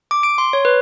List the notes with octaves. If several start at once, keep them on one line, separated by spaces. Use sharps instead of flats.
D6
D7
C6
C#5
B4